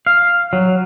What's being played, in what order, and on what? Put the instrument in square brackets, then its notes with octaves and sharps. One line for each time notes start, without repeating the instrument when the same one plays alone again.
[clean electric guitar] F5
F#3